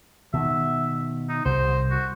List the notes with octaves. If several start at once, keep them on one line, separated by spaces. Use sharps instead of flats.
B2 D#3 E5
D#4
C2 C5
F#4